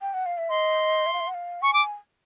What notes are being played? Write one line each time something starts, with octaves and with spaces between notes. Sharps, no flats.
G5
F#5
F5
E5
D#5 C6
E5
F5
E5
F#5
F5
G#5 C#6
D6